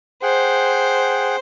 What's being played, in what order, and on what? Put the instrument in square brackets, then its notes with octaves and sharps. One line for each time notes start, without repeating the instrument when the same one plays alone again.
[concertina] G#4 F#5 G5 [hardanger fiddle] C5